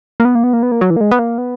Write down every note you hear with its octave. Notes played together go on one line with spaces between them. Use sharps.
A#3
B3
A#3
B3
A#3
B3
A#3
F#3
E3
A#3
G#3
B3
A#3
B3